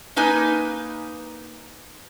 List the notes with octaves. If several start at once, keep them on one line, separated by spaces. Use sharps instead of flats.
A#3 D#4 B4 G#5